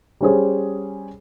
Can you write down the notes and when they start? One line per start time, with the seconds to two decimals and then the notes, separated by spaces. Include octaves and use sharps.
0.21 G3 C#4 G#4 C5